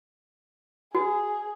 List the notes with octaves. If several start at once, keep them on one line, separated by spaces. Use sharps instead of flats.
F#4 G#4